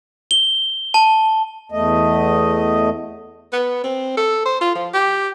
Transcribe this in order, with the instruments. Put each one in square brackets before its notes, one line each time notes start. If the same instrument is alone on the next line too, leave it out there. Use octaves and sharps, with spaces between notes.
[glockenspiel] G7
A5
[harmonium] E2 A3 D#5
[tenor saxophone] B3
C4
A4
C5
F4
F3
G4